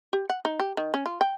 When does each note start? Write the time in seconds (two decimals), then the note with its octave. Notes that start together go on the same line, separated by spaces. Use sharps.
0.13 G4
0.30 F#5
0.45 D#4
0.60 G4
0.77 D#3
0.94 C#4
1.06 F4
1.21 G5